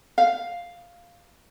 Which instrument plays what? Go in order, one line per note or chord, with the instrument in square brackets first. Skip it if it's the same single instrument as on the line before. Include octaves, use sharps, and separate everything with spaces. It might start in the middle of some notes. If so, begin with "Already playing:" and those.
[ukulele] F5